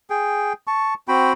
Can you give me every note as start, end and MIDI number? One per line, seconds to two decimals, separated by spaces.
0.10 0.53 68
0.10 0.53 79
0.67 0.94 81
0.67 0.94 85
1.08 1.33 60
1.08 1.33 66
1.08 1.33 79
1.08 1.33 83